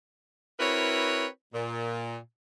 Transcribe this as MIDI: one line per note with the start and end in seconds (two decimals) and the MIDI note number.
0.60 1.26 60
0.60 1.26 64
0.60 1.26 66
0.60 1.26 70
0.60 1.26 71
0.60 1.26 73
1.53 2.17 46